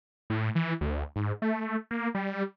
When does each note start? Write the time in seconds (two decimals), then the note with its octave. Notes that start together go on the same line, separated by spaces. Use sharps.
0.30 A2
0.55 E3
0.81 D2
1.16 G#2
1.42 A3
1.91 A#3
2.15 G3